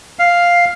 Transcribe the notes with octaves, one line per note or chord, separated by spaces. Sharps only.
F5